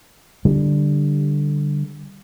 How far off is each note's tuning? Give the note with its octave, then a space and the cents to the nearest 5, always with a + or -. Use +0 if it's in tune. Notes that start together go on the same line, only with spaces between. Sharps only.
D3 +0 G3 +0